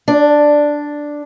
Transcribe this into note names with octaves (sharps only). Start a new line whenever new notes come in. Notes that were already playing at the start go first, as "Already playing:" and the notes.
D4